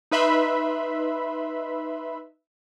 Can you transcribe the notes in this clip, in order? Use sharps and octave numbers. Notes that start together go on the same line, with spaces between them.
D#4 B4 E5 B5 C6